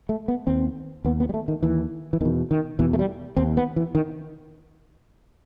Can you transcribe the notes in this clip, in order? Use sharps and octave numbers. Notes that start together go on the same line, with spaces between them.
A3
B3
D#2 C4
D#2 B3
B3
G3
A3
D#3
D#2 E3
E3
E2 B2 D#3
D#3
E2 B2 E3
A3
G3
D#2 C4
B3
E3
D#3